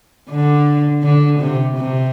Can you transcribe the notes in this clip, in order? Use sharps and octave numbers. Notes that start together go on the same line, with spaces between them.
D3
D3
C3
C3